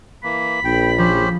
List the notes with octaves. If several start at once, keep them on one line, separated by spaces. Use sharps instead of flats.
E3 A#3 B5
A#1 G5
F3 C#4 G4 C5